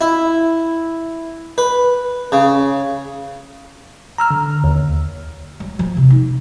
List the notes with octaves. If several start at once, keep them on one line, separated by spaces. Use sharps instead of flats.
E4
B4
C#3
A#5 E6 F6
D3
D#2
F#3
F3
C3
D#4